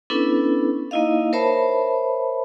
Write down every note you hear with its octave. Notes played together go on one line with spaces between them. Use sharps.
B3 C#4 D4 E4 A4 B4
A#3 D#4 E4 D#5 F5
A#4 C5 C#5 E5 A5 B5